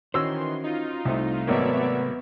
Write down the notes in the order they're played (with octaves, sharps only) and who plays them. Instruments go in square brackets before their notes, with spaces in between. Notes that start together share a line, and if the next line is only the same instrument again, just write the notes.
[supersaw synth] D#3 E3 C6 [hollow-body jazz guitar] C#4 F#4 C5 [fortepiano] C#5 E6
[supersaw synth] D#4 F4
[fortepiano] C2 [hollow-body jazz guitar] C3 A3
[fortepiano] G#1 F#3 A#3 [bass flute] B3 [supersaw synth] C#5 D5 E5